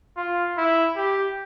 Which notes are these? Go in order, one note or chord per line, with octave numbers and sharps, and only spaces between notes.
F4
E4
G4